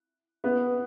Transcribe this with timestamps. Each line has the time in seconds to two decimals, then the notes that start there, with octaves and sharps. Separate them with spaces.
0.44 B3